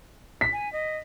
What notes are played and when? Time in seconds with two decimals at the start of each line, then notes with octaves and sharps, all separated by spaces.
0.41 B6
0.53 G#5
0.73 D#5